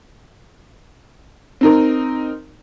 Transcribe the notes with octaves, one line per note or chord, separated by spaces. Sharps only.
C4 D#4 A#4